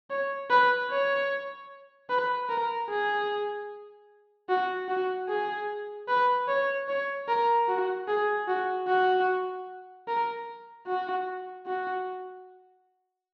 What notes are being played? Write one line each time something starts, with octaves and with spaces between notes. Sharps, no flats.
C#5
B4
C#5
B4
A#4
G#4
F#4
F#4
G#4
B4
C#5
C#5
A#4
F#4
G#4
F#4
F#4
A#4
F#4
F#4